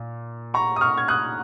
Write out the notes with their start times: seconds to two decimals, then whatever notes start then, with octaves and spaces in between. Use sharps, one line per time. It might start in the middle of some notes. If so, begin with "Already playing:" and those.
Already playing: A#2
0.54 A#5 C#6
0.76 D#6
0.81 C#6 F6
0.97 G#6
1.08 D#6 F#6